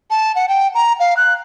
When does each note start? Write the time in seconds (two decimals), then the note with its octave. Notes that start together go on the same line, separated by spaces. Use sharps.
0.10 A5
0.35 F#5
0.49 G5
0.75 A#5
1.00 F5
1.17 F#6